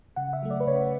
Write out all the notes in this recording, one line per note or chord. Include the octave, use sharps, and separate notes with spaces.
C#3 F#5
E5
F#3 A3
D5
B4
C#3 C#5